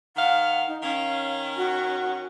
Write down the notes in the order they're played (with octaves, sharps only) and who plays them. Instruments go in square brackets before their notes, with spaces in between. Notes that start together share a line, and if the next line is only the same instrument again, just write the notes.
[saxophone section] D#3 F5 [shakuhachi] F#5
[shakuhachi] D#4
[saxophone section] D#3 C#4 [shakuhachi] F5
[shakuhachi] F#4